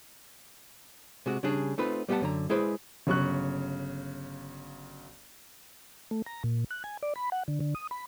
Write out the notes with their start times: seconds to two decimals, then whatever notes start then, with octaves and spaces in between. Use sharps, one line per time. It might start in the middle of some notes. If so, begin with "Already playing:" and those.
1.26 C3 G#3 F#4
1.43 C#3 G3 D4 G#4
1.78 A3 C4 D#4 F4 B4
2.09 G3 B3 G4 F5 F#5 A5
2.21 F#2 D3 A#5
2.50 G#3 E4 G#4 B4 C5 D5
3.07 G1 C#3 F#3 C#6 F#6
6.11 A3
6.26 A#5
6.44 A#2
6.71 F#6
6.84 G#5
7.03 D5
7.16 B5
7.32 F#5
7.48 D3
7.60 D3
7.75 D#6
7.91 B5